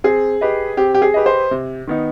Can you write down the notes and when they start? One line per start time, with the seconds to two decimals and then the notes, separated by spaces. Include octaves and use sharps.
0.04 C4 G#4
0.41 G4 B4 D#5
0.77 C4 G4
0.94 G4
1.02 G#4
1.14 G4 B4 D#5
1.26 C5
1.51 C3
1.87 D#3 B3 D#4